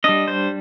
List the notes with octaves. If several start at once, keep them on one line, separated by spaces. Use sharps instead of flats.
G3 D4 D#5
C5